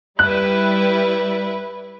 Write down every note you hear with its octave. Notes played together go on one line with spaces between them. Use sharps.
G3 E4 B4 F#6